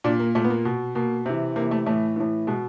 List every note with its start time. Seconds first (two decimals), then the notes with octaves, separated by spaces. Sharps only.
0.04 A#2 D4
0.20 A#3
0.35 A#2 A3
0.44 B3
0.50 A#3
0.65 B2
0.95 B2 A#3
1.26 C3 E3
1.56 C3 A#3
1.60 E3
1.71 A3
1.86 A2 E3 A3
2.16 A2 E3
2.47 B2 G#3